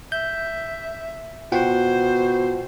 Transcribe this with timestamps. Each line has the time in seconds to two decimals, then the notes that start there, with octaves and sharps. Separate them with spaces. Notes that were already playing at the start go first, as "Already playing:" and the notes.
0.12 E5 G6
1.52 B2 F4 C5 F#5 G5